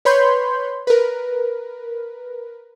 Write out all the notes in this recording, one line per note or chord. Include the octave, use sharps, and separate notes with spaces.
B4 C#5 B5 C6 G6
A#4 B4